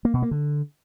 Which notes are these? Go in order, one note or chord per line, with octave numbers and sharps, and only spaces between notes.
A#3
B2
A#3
D3